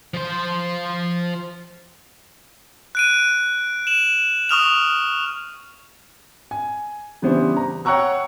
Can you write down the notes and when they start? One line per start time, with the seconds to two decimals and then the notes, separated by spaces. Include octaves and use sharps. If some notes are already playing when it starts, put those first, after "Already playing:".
0.14 F3 C5
2.95 F#6 D7 D#7
3.87 E7 F#7
4.49 C#6 D#6 F6 F7
6.51 G#5
7.22 C#3 E3 G3 B3 D4 C5
7.57 A#5
7.85 C#5 F#5 G5 A#5 C#6 E6